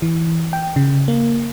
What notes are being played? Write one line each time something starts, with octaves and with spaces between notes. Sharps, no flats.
E3
G5
C#3
A#3